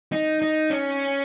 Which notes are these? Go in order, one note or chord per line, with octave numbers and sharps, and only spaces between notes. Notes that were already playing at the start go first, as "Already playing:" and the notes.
D#4
D#4
C#4